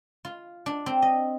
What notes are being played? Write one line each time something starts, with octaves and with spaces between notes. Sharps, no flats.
F4
D4
C4
D#5